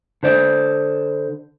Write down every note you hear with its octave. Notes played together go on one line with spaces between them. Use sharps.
D3 C5 D5